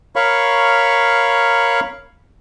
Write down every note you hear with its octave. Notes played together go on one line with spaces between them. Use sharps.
A#4 C#5 F5 B5 C#6